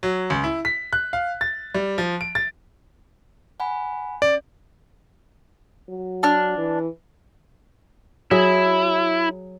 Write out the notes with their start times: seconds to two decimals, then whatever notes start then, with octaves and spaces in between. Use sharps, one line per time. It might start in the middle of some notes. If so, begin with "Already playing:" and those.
0.03 F#3
0.30 C#2
0.44 E4
0.65 B6
0.93 F#6
1.13 F5
1.41 A6
1.75 G3
1.98 F3
2.21 D7
2.35 A6
3.60 F#5 G#5 B5
4.22 C#4 D5
5.89 F#3
6.23 D4 F6
6.58 E3
8.31 F#3 E4 G#4